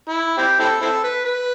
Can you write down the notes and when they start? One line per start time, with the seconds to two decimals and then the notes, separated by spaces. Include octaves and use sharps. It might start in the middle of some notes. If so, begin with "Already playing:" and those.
0.08 E4
0.38 C4 E4 G4
0.60 C4 E4 A4
0.82 C4 E4 A4
1.04 B4
1.25 B4